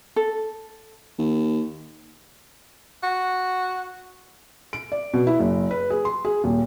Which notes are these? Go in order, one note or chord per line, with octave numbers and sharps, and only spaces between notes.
A4
D#2
F#4
D7
D5
B2
E4
F#1
B4
G#4
C6
G#4
D#1